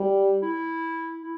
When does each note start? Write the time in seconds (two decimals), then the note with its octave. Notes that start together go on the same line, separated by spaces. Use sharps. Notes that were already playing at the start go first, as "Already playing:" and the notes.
Already playing: G3
0.42 E4
1.23 E4